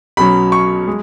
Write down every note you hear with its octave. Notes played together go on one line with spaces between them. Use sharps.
B1 B2 F#3 C#4 B5
C#6
G#3